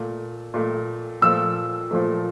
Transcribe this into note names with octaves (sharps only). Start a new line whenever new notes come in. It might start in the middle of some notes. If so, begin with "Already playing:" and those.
Already playing: A#2 A3
A#2 A3
A#2 F3 A3 E6
A#2 F3 A3